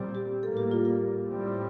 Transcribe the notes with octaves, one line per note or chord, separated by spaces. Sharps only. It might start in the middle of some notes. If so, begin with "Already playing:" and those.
Already playing: A#2 G3 C4
G4
A2 G3 A#3 A4
G4
F4
G4
A2 G3 C4